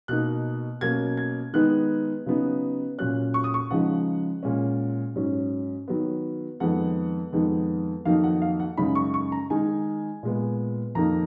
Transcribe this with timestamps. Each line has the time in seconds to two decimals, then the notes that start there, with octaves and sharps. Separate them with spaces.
0.08 B2 A#3 D#4 F#6
0.81 B2 F#3 A#3 C#4 G#6
1.17 G#6
1.53 D#3 G#3 B3 D#4 F#6
2.26 C#3 F#3 B3 D#4
2.98 A#2 F#3 C#4 F#6
3.34 C#6
3.44 D#6
3.54 C#6
3.71 C#3 F3 G#3 D#4 F#5
4.43 A#2 G#3 C#4
5.15 G#2 F#3 C#4
5.88 D#3 F#3 B3
6.60 F2 D#3 G#3 B3 D#4 F#5
7.33 F2 D#3 G#3 B3 D#4
8.05 F2 D#3 F#3 A#3 D#4 F5
8.24 F#5
8.42 F5
8.60 F#5
8.77 F#2 C#3 G#3 D#4 B5
8.95 C#6
9.14 C#6
9.32 A#5
9.50 D#3 G#3 D#4 G#5
10.23 A#2 G#3 B3
10.95 F2 D#3 A#3 D#4 A#5